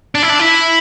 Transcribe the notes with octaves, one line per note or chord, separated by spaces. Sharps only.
D4
E4
D4
E4